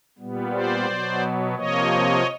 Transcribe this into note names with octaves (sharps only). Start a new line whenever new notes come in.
A#2 G3 B3
C5 D5
B2 F#3 B3
C3 F3 A#3 C#5 D#5